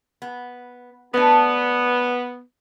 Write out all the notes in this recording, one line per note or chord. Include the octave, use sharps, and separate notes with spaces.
B3
G#3 A3 B3 D4